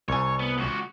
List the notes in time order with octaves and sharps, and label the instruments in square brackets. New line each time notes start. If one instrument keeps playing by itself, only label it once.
[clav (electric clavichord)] C2 G#5 [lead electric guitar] C#5
[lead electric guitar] B3
C#2 F#4